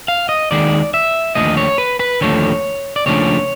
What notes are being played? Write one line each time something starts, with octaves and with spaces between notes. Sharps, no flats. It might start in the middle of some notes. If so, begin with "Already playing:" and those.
F5
D#5
D#2 D#3 G#3 D5
E5
D#2 D3 F3 A3 D#5
C#5
B4
B4
D#2 D3 F3 A3 C#5
D5
D#2 C#3 F3 A3 D4 C#5